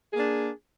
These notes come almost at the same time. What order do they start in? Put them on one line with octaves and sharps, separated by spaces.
G#4 A#3 D4